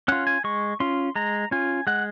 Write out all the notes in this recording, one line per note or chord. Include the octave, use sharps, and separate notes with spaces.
C#4 F4 F#5
G#5
G#3 C#6
C#4 F4 C6
G#3 A#5
C#4 F4 G#5
G#3 F#5